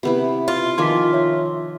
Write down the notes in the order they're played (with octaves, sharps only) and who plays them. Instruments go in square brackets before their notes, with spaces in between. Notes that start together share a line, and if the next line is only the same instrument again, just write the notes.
[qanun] C3 B3 E4
[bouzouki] F4
[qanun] D#3 F3 G#5 [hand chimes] C6 D6 B6
[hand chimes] C#5 E5